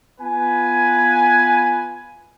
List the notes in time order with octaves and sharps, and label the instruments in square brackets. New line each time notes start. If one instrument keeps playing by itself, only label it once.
[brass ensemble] B3 F4 B4 G#5